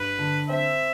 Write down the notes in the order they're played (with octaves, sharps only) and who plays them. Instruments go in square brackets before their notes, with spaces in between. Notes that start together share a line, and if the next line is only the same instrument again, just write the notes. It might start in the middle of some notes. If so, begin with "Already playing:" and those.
Already playing: [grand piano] G2 [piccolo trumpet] B4
[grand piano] D3
[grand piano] C4 [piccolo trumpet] E5